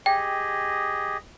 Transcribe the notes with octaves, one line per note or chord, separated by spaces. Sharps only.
G4 G#4 D#5 G5